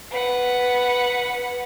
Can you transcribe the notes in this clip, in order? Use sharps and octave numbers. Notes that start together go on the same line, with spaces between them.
B4 F#5